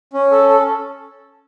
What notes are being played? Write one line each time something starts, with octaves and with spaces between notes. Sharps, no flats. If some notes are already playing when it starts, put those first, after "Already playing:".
C#4
A4
A4